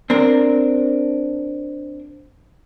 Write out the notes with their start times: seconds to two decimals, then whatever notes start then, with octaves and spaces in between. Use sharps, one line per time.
0.10 C4 D4 A#4